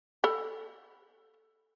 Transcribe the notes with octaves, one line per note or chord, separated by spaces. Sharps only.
A4 B5